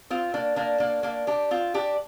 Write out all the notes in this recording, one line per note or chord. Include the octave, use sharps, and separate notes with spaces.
C4 F4
A#3 D4
A#3 D4
A#3 D4
A#3 D4
D4 G4
C4 F4
D4 G4